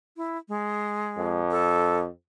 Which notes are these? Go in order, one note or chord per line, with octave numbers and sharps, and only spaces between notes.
E4
G#3
F2
A4